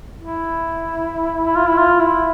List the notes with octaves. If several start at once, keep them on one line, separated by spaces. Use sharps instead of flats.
E4
E4
F4
E4
F4
E4